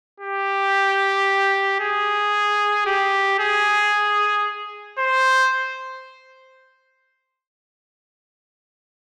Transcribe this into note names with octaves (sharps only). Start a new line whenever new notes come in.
G4
G#4
G4
G#4
C5